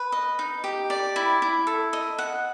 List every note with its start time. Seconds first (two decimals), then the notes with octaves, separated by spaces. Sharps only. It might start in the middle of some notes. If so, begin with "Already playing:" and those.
Already playing: B4
0.12 D#5
0.39 D#4
0.64 G4
0.90 D5
1.16 E4
1.42 E4
1.67 A4
1.93 D#5
2.18 F#5